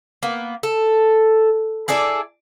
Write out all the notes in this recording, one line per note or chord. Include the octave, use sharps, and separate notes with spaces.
A#3 B3
A4
E4 G#4 A4 D5